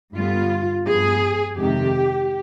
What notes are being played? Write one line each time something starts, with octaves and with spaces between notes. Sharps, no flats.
G2 D3 G3 B3 F4
G2 F3 B3 G#4
F2 C3 D#3 G#3 G4